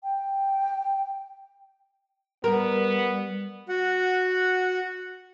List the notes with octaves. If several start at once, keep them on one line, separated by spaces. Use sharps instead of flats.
G5
G3 B3 A#4
F#4 F#5